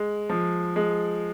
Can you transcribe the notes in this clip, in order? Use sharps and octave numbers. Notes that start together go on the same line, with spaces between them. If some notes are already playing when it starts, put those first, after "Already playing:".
Already playing: G#3
F3
G#3